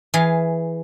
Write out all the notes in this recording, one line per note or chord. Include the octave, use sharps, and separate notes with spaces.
E3 G#4 F5